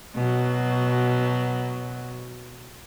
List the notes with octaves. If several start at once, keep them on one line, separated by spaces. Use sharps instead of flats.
B2 F#3